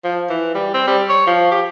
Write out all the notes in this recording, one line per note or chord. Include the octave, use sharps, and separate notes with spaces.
F3
E3
G3
C4
G3
C#5
F3
G4